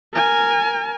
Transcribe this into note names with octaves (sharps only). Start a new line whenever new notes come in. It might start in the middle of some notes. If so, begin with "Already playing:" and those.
A#4 G#5